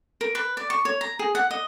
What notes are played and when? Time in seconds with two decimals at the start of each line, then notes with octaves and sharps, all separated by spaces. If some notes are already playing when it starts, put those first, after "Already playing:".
0.21 A#4
0.35 B4
0.57 D5
0.70 C#6
0.85 C#5
1.01 A#5
1.19 G#4
1.35 F#5
1.51 D#5